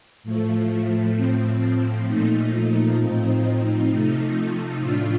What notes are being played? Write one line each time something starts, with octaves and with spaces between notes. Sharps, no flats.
A2 F3 A3
A2 F3 C4
A#2 F3 A3 D#4
A2 F3 C4 D#4
C3 F3 A3 D#4
A2 F3 A3 D4 F4